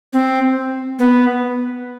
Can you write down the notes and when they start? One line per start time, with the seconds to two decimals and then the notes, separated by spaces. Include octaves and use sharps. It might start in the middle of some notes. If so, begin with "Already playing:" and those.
0.13 C4
0.99 B3